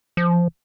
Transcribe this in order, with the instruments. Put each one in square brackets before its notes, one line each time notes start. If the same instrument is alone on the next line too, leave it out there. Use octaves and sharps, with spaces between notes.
[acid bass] F3